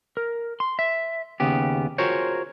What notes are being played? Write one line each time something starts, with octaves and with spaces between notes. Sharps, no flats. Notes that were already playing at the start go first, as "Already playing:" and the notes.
A#4
C6
E5
D#2 C#3 B3 G4
F4 F#4 G#4 A#4 C5 C#5